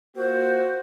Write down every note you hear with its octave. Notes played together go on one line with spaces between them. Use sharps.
A#3 F4 F#4 C5